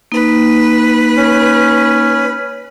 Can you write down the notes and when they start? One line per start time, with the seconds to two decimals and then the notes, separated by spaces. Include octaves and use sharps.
0.12 A#3 D#4 B4
1.16 C#4